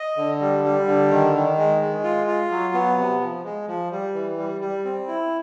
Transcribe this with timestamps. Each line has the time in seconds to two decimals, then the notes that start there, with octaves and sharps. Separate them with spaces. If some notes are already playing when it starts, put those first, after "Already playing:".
Already playing: D#5
0.17 D3
0.40 G3
0.64 G3
0.87 D3
1.10 D#3
1.35 D#3
1.58 G#3
1.81 G#3
2.04 F4
2.27 F4
2.51 F#3
2.74 B3
2.98 C3
3.20 F3
3.44 G#3
3.68 F3
3.91 G3
4.14 E3
4.38 G3
4.61 G3
4.85 C4
5.07 E4